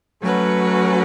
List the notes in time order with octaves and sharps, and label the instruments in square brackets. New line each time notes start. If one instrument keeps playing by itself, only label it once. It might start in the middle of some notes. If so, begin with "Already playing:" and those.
[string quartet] F#3 A3 C#4 F#4 B4